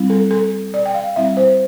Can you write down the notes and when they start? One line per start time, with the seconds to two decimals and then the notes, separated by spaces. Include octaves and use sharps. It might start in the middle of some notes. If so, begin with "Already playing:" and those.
Already playing: G3 C4 E4
0.10 A4
0.31 A4
0.74 D5
0.86 G5
0.94 F5
1.16 G3 C4 E4 E5
1.37 C5